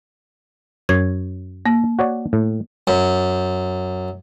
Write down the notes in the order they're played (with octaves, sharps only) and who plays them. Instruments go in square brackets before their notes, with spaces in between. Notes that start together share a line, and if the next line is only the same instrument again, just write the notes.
[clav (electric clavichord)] F#2 C#5 [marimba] G#6
[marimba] A#3
[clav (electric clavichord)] F#4 C#5 D5
A2
[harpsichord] F#2